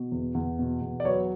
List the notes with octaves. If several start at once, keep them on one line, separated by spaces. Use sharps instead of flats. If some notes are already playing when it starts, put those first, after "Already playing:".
Already playing: B2
E2
E2
B2
E2
D5
F#3 B4 C#5